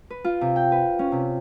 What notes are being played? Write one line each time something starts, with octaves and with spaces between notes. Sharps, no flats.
B4
F4
C3
G5
B4
C#4
C3